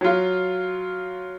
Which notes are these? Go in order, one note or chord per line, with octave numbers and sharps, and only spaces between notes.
F#3 F4